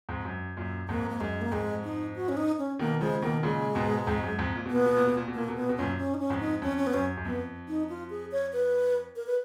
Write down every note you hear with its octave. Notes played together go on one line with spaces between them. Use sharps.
F2 G#2
F#2
F#2 A#2
F2 G#2 A#3
A#3
F#2 G#3
A#3
F2 G#2 G#3
D#4
F#4
C#4
D#4
C#4
B2 D#3 A#3
C#3 F3 G#3
B2 D#3 A#3
A#2 C#3 G#3
G#2 B2
F2 G#2
F#2
F2 G#2
A#2
B2 B3
A#2
B2
A#2
B2
A#2
B2
A#2 A#3
B2
A#2 B3
B2
F#2 A#2 C#4
C#4
D#4
C#4
F2 G#2
D#4
F2 C#4
C#4
B3
F#2 C#4
F#2
F2 B3
D#4
F4
G#4
C#5
B4
A#4
B4